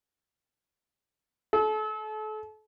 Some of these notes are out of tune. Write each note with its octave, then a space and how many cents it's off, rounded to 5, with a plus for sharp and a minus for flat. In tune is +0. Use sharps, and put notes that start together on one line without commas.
A4 -35